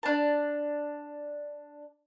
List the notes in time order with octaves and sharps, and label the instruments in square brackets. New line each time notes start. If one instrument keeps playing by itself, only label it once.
[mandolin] D4 A5